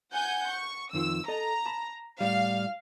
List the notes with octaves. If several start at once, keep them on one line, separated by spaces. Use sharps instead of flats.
F#5 G#5 G6
C#6
F2 D#3 F3 E6
A4 D#5 A#5
A5 B5
A2 G3 F5